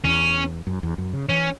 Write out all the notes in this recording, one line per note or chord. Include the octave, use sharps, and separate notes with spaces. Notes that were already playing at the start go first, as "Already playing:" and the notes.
E2 C#4
F#2
E2
F#2
C#3
E3 C#4